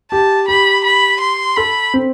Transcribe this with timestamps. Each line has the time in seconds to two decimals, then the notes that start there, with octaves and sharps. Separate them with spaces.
0.12 G4 A5
0.48 G4 B5
0.84 B5
1.21 C6
1.56 A4 B5
1.94 C4